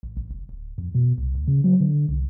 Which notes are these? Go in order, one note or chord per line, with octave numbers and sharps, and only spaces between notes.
A1
A1
F1
D1
F2
B2
C2
D2
C#3
F#3
D3
C2